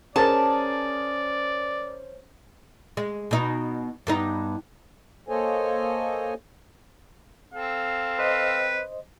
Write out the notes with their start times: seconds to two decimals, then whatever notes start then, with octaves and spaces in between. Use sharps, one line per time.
0.16 C#4 G#4 A#4 C5 D5 A5 A6
2.97 G#3
3.31 B2 D#4
4.07 G2 B3 D#4
5.29 A#3 A4 C5 C#5 D#5 G#5
7.54 C4 A4 F5
8.19 B4 C5 D#5